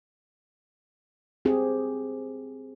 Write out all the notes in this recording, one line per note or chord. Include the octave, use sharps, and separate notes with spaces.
C4 G4 G#4